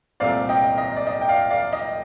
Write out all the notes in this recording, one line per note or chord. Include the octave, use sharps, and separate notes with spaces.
C2 A#2 A3 C4 D5 F5
D#5 G5
D#5
D5
D#5
G5
D5 F5
D5 F5
D#5